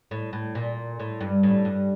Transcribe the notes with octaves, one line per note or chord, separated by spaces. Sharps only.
A2
A2
A#2
A2
G2
A2
G2